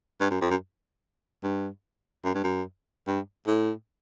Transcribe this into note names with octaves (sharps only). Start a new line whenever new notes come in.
G2
F#2
F2
F#2
G2
F#2
G2
F#2
G2
A2